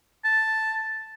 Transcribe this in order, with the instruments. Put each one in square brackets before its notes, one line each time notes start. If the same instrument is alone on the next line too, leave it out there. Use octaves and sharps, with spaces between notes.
[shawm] A5